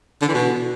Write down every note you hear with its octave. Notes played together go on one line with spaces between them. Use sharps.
D3
E3
B2